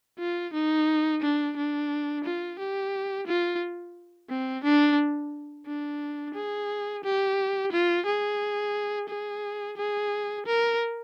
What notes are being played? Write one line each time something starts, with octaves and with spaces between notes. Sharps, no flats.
F4
D#4
D4
D4
F4
G4
F4
C4
D4
D4
G#4
G4
F4
G#4
G#4
G#4
A#4